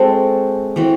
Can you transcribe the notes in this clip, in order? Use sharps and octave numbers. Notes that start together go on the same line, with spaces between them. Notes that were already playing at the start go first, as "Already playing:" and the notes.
Already playing: G#3 C4 F#4 A4
E3 C4 F#4